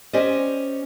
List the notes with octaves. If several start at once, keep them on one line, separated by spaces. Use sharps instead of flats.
C#4 G4 C5 D5 D#5